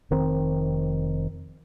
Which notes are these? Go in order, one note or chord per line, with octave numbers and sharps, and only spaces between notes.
F1 D#3 C4